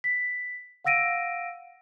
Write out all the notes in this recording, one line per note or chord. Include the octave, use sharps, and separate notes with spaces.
B6
F5 F#5 E6 A#6 D7 D#7